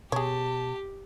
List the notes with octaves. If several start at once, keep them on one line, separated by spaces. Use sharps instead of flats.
B2 G4 G#4 C#5 A5